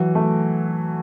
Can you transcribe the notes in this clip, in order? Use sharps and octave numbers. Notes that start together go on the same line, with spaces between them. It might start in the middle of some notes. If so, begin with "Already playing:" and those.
Already playing: E3 F#3
A3